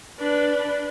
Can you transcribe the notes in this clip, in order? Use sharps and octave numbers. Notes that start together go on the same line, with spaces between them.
D4 B4